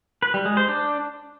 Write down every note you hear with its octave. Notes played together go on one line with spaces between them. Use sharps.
B4
G3
G#3
C5
D4